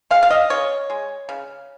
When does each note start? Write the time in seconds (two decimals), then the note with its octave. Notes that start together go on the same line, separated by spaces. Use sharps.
0.11 G#3 F5
0.23 F5
0.31 D#5
0.50 C#3 C#5
0.90 G#3
1.29 C#3